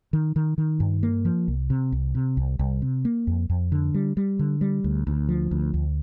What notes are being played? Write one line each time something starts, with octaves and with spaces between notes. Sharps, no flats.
D#3
D#3
D#3
G2
A#3
F3
C2
C3
C2
C3
C2
C2
C3
A#3
F2
F2
D3
G3
G3
D3
G3
D2
D2
F3
D2
D2